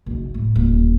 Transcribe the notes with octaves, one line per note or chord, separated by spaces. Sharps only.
F#1 B1
A2
D#1